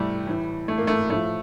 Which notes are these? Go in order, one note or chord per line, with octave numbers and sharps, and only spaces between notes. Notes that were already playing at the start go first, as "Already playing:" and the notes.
Already playing: C3 E3 G3 A3
A2 E3
A3
A#3
A3
A2 F3 A3